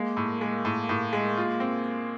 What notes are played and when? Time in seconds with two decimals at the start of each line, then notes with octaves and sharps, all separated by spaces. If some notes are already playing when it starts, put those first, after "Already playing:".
Already playing: G#3 A#3
0.17 A2
0.41 G#3
0.65 A2
0.89 A2
1.13 G#3
1.37 F4
1.60 C4